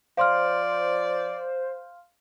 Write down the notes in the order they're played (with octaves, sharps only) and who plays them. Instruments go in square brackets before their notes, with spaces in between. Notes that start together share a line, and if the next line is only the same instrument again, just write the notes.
[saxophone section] F3 D5 [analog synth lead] C5 [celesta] F5 C6 F6